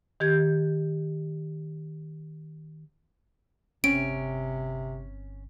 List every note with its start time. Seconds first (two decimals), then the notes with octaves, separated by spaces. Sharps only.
0.20 D#3 G4 G6 G#6
3.84 G1 C3 C4 C#4 D7